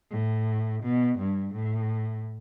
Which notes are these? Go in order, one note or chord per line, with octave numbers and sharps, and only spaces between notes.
A2
B2
G2
A2